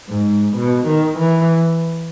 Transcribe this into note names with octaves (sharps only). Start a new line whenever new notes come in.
G#2
B2
D#3
E3